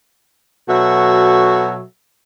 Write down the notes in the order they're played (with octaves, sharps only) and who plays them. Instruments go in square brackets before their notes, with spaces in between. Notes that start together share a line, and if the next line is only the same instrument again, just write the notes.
[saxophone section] B2 F#3 F#4 A4 E5